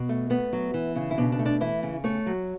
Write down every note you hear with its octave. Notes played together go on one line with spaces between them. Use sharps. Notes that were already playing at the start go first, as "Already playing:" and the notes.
Already playing: B2
A3
A3 B3
F#3
E3
C#3
E4
B2 D4
D4
A3
D4
E3 E4
C#3
A3 C#5
F#3